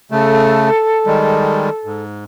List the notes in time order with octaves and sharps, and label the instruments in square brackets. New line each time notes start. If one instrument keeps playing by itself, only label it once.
[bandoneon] C#3 A3 [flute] A4
[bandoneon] D#3 G3 G#3
G#2